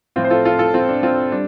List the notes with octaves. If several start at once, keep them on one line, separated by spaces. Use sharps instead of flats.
A2 F3 C4 F4
C5
F4 A4
F4 A4
F4 A4
C4 F4
D4
C4 F4
G3 D4